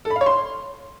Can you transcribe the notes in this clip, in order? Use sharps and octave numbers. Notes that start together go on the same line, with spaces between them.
A4
B5
F5
C#5
C6